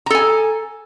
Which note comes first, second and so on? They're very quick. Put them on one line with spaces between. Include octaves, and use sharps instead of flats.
A#5 A4 G#5